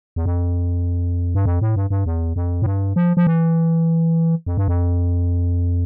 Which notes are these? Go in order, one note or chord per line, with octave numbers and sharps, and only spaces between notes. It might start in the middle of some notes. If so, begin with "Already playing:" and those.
E2
F2
G2
F2
A2
G2
G2
E2
F2
A2
G2
F3
F3
E3
F2
G2
F2